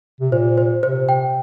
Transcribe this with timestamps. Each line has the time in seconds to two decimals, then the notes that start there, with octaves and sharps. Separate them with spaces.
0.21 C3
0.32 A#2 C5
0.58 C5
0.83 C3 C5
1.09 G5